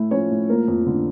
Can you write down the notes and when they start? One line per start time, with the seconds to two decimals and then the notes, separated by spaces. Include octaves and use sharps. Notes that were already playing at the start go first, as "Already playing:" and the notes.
Already playing: A2 A3 E4
0.11 F3 C#4 C#5
0.31 A2
0.49 F3 A#3 A#4
0.68 F2
0.86 D3